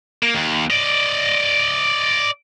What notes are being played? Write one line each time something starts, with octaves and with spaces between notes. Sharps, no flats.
A#3
D#2
D5 D#5